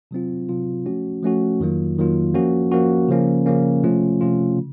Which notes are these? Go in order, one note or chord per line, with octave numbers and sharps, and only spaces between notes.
C3 F#3 C4 F4
C3 F#3 C4 F4
F3 A3 C#4 F#4
F3 A3 C#4 F#4
F2 D#3 F#3 A#3 F4
F2 D#3 F#3 A#3 F4
F3 A#3 C#4 F#4
F3 A#3 C#4 F#4
C#3 F3 A#3 C#4
C#3 F3 A#3 C#4
C3 F3 A3 C#4 F4
C3 F3 A3 C#4 F4
C#3